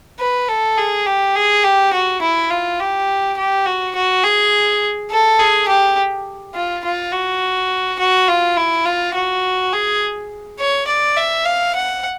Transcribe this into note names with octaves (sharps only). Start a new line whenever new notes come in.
B4
A4
G#4
G4
G#4
G4
F#4
E4
F4
G4
G4
F#4
F#4
G#4
A4
G#4
G4
F4
F4
F#4
F#4
F4
E4
F4
F#4
G#4
C#5
D5
E5
F5
F#5